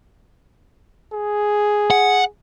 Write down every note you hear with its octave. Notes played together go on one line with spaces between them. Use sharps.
G#4
F#5